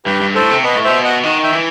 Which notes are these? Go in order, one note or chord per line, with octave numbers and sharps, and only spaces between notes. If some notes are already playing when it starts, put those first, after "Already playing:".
G2 G4 B4
G2
A2 A4 C5
C3
B2 B4 D#5
A2
B2 C5 E5
D#5 F#5
D#3 D#5 F#5
E5 G5
E3